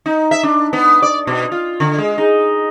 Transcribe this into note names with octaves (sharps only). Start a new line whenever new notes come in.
D#4
E5
D4
B3
D5
B2
F4
D3
G#3
D#4